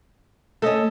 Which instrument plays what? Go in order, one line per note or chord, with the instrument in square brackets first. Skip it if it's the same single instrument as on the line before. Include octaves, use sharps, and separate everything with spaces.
[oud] A3 C#4 [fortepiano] A4 D#5